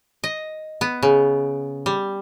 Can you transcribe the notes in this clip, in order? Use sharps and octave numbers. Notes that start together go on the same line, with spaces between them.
D#5
B3
C#3
G3